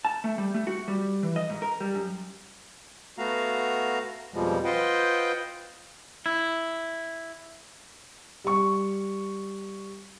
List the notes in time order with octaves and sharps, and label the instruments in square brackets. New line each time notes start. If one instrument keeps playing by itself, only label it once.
[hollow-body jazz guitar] A5
A3
G3
A3
F#4
G3
E3
D#5
G#2
A#4
G3
F#2
[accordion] A3 B3 F#4 F5 A#5
F2 B2 F3 G3 G#3
F4 B4 C5 D#5 F#5 G5
[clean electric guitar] E4
[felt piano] G3 C#6